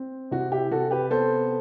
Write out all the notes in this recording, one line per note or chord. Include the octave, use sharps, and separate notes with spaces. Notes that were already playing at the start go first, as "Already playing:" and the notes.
Already playing: C4
C3 F#4
E4 G4
C3 F#4 A4
G4 B4
B3 A4 C5